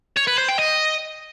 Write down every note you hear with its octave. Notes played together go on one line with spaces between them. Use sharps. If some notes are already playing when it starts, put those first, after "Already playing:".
C#5
B4
C5
G5
D#5